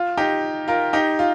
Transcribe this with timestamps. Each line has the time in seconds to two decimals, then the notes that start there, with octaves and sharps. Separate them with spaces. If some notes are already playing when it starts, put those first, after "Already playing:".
Already playing: F4
0.17 D#4 G4
0.68 F4 A#4
0.93 D#4 G4
1.19 F4